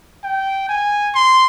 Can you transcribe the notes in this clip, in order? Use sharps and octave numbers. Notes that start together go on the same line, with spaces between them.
G5
G#5
C6